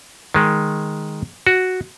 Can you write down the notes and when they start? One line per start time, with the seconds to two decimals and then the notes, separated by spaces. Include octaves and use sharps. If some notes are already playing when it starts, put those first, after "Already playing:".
0.34 D#3 G#3
1.47 F#4